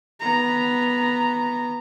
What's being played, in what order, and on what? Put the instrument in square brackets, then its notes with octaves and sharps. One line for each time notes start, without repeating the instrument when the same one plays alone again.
[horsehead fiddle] B3 A#5